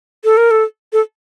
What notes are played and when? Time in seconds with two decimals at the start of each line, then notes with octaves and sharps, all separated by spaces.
0.24 A4
0.37 A#4
0.51 A4
0.93 A4